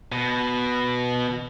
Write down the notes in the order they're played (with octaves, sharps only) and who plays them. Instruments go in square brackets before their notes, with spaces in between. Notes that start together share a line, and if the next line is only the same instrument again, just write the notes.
[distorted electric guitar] B2